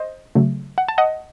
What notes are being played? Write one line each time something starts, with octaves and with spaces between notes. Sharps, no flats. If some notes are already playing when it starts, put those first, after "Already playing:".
Already playing: C5 D#5
C#3 F#3 A3
F#5
A5
D#5 F#5